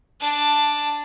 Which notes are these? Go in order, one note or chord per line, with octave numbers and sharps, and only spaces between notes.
D4 A5